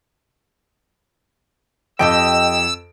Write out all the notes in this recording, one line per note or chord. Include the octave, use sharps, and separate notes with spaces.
F2 G4 D#5 G5 E6 D7